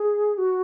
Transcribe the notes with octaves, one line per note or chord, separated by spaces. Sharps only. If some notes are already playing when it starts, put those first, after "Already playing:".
Already playing: G#4
F#4